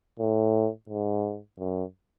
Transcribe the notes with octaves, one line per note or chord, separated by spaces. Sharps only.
A2
G#2
F#2